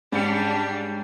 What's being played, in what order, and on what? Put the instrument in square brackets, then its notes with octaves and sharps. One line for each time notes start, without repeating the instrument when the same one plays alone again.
[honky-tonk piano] G#2 C#4 C#7 [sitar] G3 [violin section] D4 G4